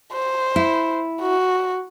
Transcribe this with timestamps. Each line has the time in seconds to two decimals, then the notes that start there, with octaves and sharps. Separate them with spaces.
0.13 C5
0.56 E4
1.21 F#4